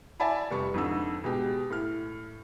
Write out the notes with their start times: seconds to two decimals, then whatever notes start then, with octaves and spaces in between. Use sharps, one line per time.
0.20 D5 E5 G#5 A5 B5
0.51 F1 G3 C#6
0.74 F2 G#2 D3 E6
1.24 B2 G#3 G4
1.70 A2 F6